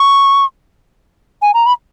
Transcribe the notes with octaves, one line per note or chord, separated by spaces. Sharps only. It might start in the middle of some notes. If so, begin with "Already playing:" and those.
Already playing: C#6
G#5
A#5
B5